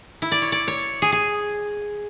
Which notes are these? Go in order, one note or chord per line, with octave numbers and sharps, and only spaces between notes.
E4
D5
C#5
D5
C#5
G#4
G#4